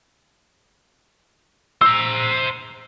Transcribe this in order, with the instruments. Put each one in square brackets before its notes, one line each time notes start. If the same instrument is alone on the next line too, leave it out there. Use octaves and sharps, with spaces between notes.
[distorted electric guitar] C5 A#5 [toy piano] E6